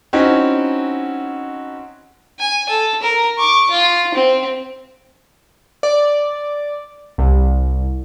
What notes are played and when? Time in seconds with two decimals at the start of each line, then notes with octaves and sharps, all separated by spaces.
0.13 C4 C#4 D#4 E4 F#4
2.39 G#5
2.69 A4
3.02 A#4
3.38 C#6 D6
3.71 F4
4.14 C4
5.83 D5
7.18 C2